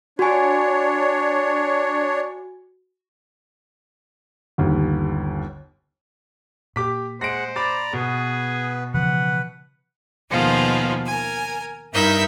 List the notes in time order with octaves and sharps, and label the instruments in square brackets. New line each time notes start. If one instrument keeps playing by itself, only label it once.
[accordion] D4 C#5 [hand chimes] F#4 G#5
[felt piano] G1 D#2
[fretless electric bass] A#2 [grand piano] G4 D6 B6
[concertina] G#3 F#5 [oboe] C5 [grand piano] A#6 D7
[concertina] D5 A#5 [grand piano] B5 D6 A6
[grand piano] B2 [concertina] B3 [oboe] G#4
[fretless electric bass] C#3 E3 F3 [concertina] B4 [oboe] F#5
[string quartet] D#2 B2 D#3 F3 G#3 F4
A#4 G#5
G2 D#4 E4 A#4 E5 G6